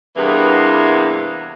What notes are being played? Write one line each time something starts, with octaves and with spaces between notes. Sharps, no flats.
E2 G2 C3 E3 A#3 B3